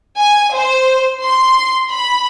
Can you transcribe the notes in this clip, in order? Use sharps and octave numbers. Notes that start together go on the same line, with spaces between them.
G#5
C5
C6
B5